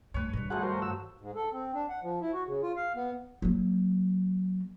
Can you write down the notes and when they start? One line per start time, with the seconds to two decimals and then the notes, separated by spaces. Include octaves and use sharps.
0.14 D2 G2 B4 C#5
0.33 G2 D#3
0.50 F3 F#3 A3 F#4 G#4 F#5
0.63 G3 A#4 C5
0.82 F#4 E6
1.20 G#2
1.35 A4
1.53 C4
1.74 D4
1.89 F#5
2.03 F3
2.21 E4
2.33 F#4
2.47 C#3
2.63 F4
2.76 F5
2.96 B3
3.42 F#3 A#3